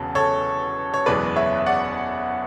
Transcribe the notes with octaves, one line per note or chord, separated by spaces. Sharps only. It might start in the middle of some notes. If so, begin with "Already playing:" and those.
Already playing: E1 E2 C#3 F#3 A4
A4 C#5
C#5
F#1 E2 B2 G#3 B4 D5
C#5 E5
E5
D5 F#5